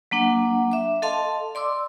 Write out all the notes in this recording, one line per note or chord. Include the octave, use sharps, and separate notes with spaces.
F#3 A#3 D4 F#5
E5 D6
A4 D#5 F5 A5 C6
D5 C6 D6 E6